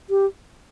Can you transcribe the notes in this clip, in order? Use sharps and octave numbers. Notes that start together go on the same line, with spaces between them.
G4